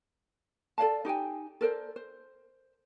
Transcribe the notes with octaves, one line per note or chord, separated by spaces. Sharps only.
A4 D5 F5 A5
D#4 G4 G5 G#5
A4 A#4 C5 D5
C5